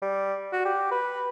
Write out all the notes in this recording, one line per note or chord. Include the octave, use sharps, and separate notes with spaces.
G3
F#4
G4
B4